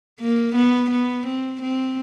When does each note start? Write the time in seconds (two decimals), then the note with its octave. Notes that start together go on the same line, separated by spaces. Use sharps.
0.20 A#3
0.55 B3
0.91 B3
1.26 C4
1.62 C4